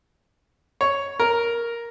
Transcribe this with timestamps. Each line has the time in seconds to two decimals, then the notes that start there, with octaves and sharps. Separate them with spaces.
0.81 C#5
1.20 A#4